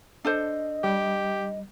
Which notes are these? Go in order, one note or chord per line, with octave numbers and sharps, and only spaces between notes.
D4 A4 C5 D#5
G3 G4